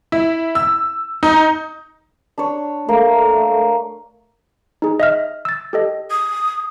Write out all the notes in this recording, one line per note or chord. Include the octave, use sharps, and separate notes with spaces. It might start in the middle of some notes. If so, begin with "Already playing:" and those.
E4
E6
D#4
D4 C#5
A3 A#3
D#4 G#4
D#5 E5 F6
E6 A6
G4 A4 D#5
D#6